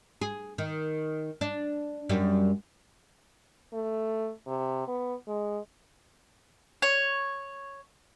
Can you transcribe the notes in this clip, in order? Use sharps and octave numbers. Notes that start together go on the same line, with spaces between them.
G#4
D#3
D4
F#2 G3
A3
C3
B3
G#3
C#5